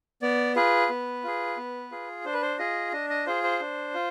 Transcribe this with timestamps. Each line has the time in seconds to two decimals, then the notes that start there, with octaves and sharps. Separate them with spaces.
0.22 B3 D5
0.56 F4 G#4 B4
0.90 B3
1.24 F4 G#4
1.57 B3
1.91 F4 G#4
2.25 D4 C5
2.33 B4
2.42 C5
2.59 F4 G#4 D#5
2.92 D4 D#5
3.10 D#5
3.27 F4 G#4 C5
3.44 C5
3.61 D4
3.94 F4